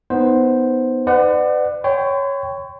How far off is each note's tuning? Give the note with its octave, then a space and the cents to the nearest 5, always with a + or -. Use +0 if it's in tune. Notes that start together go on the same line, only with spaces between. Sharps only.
B3 +5 D#4 +0 C5 +0
B4 +45 D5 +35 F#5 +0
C#5 +0 G5 +0 C6 -45